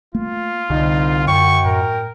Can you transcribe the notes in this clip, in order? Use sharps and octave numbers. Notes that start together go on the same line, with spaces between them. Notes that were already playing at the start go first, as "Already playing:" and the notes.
A3 A#3 F4
C2 D3 D#4
F#2 G5 C#6
A2 A#4